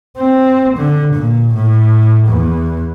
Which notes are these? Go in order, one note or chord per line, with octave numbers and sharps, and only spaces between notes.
C4
D3
A#2
A2
E2